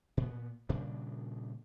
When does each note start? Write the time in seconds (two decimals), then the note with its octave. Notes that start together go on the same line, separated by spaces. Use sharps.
0.17 A#2 B3
0.69 A#2 C#3 G3 D4